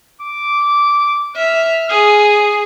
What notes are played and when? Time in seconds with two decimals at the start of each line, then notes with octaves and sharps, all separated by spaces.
0.21 D6
1.36 E5 F6
1.90 G#4 D#6